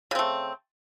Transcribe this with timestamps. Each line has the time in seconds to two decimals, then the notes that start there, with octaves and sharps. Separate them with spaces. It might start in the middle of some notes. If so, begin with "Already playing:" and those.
0.11 C#3
0.15 C4
0.19 A3